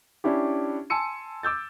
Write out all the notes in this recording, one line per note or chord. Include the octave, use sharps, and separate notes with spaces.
C#4 D4 E4 G4
G#5 A5 C6 E6 C#7 D#7
D6 E6 G6 A6